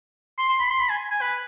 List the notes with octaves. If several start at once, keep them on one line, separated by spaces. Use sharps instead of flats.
C6
C6
B5
C6
B5
G#5
G#5
B4